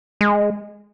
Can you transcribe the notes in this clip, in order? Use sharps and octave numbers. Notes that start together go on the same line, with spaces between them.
G#3